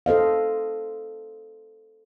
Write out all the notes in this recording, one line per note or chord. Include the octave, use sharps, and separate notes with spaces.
A4 C5 D#5 F5